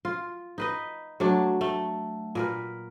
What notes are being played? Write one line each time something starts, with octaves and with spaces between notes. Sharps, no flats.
F4
D#4 B4 D#5
F#3 A3 D4
A3
A#2 A#4 B4